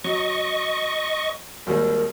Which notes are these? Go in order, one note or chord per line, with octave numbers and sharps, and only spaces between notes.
F#3 D#5 C#6
G#1 D#2 G3 A#4